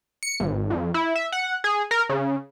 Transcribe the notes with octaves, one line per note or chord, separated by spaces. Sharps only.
C#7
G#1
F2
E4
E5
F#5
G#4
A#4
C#3